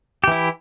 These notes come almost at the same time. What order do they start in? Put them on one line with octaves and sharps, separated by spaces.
G4 E3 E4